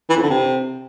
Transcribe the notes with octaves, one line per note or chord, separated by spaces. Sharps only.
E3
F2
D3
C3